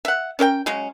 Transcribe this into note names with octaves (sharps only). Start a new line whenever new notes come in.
E5 F#5
C#4 A#4 E5 G5
C#3 F#3 G#3 C#4